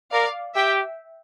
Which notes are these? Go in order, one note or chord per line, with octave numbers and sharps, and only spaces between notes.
A#4 D5 F5
G4 E5 G5